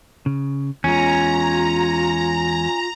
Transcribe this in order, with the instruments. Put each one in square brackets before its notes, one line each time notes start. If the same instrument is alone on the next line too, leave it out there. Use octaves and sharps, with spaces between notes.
[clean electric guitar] C#3
[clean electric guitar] E2 G#3 [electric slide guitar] C#4 [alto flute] F4 [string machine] A#5